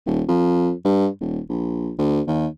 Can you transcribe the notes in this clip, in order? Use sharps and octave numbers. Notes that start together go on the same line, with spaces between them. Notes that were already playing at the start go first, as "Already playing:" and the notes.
D#1
F2
G2
D#1
A#1
D2
D#2